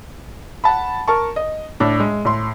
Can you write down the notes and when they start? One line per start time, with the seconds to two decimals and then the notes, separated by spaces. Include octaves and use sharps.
0.64 F#5 A5 B5
1.08 A#4 A5 C#6
1.36 D#5
1.80 A2 D4
2.00 G#3
2.25 A2 C6